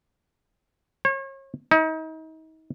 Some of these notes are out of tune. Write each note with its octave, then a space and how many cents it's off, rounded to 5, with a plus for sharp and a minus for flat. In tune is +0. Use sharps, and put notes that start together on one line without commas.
C#5 -35
D#4 +35